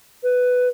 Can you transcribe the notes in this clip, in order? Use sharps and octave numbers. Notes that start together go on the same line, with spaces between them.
B4